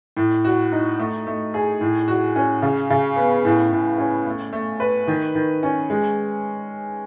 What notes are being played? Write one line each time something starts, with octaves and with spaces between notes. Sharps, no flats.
A2
F#4
D#4
A3
A3
G#4
A2
F#4
C#4
C#3
C#3
B3
A2
A2
C#4
A3
A3
B4
D#3
D#3
C#4
G#3